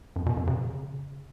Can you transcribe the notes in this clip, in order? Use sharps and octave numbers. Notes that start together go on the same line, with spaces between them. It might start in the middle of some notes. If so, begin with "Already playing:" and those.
F#2
B2
F#2
C#3